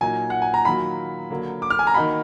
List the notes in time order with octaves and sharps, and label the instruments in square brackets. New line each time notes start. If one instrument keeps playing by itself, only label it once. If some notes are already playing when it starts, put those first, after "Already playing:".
[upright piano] A#2 F#3 A#3 D#4 [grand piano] G#5
[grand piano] F#5
G#5
A#5
[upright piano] D#3 F#3 A#3 F4 [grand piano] B5
[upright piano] D3 F#3 A#3
[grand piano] D6
F6
G#5
A#5
[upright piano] D#3 A#3 D#4 F#4 [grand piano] B5